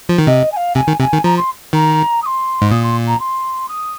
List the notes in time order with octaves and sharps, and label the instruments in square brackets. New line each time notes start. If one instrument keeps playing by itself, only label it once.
[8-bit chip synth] F3
D#3
[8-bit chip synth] C3 [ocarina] D#5
[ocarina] G#5
F5
[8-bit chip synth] C3 [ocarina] G#5
[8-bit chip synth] D#3
[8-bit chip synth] C3 [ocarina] G#5
[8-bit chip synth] D#3
[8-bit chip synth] F3 [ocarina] A#5
[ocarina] C6
[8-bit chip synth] D#3 [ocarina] A#5
[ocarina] D#6
C6
[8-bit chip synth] G#2
[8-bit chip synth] A#2 [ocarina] D#6
[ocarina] C6
A#5
C6
D#6